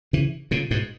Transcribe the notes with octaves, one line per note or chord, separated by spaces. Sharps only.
C#3 E3
A#2 C#3
G#2 B2